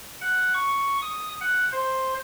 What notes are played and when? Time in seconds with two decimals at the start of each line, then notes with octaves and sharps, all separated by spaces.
0.21 F#5
0.54 C#6
1.02 D#6
1.41 F#5
1.72 C5